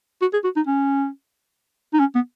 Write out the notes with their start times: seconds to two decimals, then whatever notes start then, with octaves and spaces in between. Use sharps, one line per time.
0.22 F#4
0.33 G#4
0.44 F#4
0.56 D#4
0.67 C#4
1.94 D#4
2.00 C#4
2.15 B3